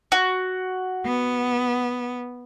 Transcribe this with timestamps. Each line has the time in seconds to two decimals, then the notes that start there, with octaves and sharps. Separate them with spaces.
0.12 F#4
1.06 B3